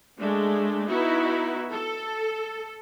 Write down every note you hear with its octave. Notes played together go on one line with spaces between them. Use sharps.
G#3 A3 D4
B3 D#4 E4 F#4
A4